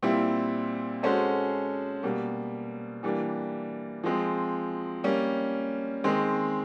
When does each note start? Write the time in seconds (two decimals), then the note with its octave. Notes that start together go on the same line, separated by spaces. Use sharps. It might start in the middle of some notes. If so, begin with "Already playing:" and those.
0.03 A#2 G3 C4 E4
1.03 G#3 C#4 F#4 A4 C5
2.03 B2 G3 A#3
3.03 E3 G3 A#3 D4
4.04 F3 G#3 C4
5.04 G3 A#3 C#4
6.04 D#3 G#3 C4